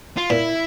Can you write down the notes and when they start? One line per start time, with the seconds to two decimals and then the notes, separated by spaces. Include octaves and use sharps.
0.18 F4
0.30 A#2 E4